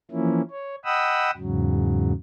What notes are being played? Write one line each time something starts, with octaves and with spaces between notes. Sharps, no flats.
E3 F3 A#3 C#4 E4
C#5
D#5 F#5 G5 B5 D#6 E6
E2 G#2 C#3 F#3